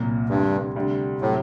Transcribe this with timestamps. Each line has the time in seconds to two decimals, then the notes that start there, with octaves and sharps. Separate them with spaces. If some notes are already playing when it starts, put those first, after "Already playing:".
Already playing: C2 A#2 F#3 A#3
0.29 D2 G2 C3 G3
0.76 D2 C3 G3
1.21 A2 C3 F#3